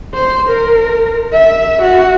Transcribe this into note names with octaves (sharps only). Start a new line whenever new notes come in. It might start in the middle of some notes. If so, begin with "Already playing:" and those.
C5
A#4
E5
F#4